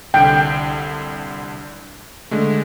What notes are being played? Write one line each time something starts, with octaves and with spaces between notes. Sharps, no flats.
C2 D3 G5
D3 G#3 A3